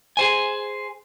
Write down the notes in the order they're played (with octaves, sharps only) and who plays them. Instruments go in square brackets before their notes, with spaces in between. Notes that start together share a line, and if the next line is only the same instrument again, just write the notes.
[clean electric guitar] G#4 C5 G#5